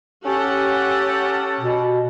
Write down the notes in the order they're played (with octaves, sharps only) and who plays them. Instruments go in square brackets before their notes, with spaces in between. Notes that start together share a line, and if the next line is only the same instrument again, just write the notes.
[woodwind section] C#4 A4 [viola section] G4 F#5
[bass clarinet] B2